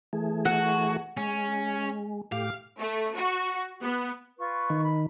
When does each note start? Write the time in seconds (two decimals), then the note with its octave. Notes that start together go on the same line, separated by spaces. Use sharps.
0.13 E3 A3 G#4
0.45 F#4 F#5
1.17 G#3 C#4
2.32 A2 G4 F5 D6
2.79 A3
3.15 F#4
3.82 B3
4.38 F4 B4 C#6
4.70 D#3
4.83 B5